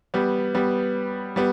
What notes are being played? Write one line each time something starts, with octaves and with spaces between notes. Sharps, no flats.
G3 B3
G3 B3
G3 B3